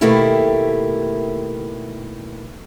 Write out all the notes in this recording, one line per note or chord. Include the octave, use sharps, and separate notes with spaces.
B2 D#3 A3 A#3 E4 G4